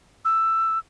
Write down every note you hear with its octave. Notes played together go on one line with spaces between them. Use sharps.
E6